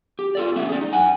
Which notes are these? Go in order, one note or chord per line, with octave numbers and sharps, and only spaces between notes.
G4
F4 A4 D5
D3 G#3 C#4 E5
G#4 D5
D#4
F#2 F#5 G#5